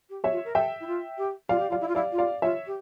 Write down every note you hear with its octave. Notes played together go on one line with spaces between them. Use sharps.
G4
C#5 E5
F4
A#4
A4 E5 G5
E4
F4
G4
F4 D5 F5
G4
F4
D5 F5
E4
F4
E4 D5 F5
F4
D5 F5
F4 C#5 E5
G4